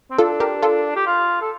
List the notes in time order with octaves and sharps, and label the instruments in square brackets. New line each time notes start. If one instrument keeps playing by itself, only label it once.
[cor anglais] C4
[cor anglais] D4 [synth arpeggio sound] F4 A4
[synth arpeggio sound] G4 A#4
F4 A4
[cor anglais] G4
F4
A4